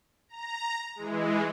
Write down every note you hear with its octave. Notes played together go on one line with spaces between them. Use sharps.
A#5
E3 G#3